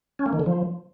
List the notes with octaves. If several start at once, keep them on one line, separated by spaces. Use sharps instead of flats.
C#4
A#3
D#3
D3
F3